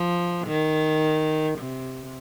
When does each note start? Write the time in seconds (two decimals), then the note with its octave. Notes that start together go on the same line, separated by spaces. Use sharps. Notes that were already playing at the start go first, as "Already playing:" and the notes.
Already playing: F3
0.47 D#3
1.58 C3